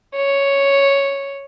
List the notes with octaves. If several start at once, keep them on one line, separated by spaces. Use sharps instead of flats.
C#5